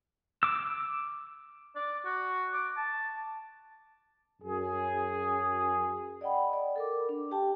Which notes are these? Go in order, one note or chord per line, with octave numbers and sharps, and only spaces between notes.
D6 E6
D5
F#4
D6
A5
F#2 G#4
D5 D#5 F#5 G5 B5
D5
A4 A#4 D6
D4
G4 G5 A5